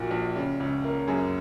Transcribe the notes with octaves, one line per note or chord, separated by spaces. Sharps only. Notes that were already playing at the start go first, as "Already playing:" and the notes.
Already playing: A#1 A#2 F#4
A#1
C#3
C#2
A#3
F#2 G#4